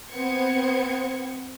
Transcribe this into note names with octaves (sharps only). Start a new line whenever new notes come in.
B3 C4 C5 G#6 C#7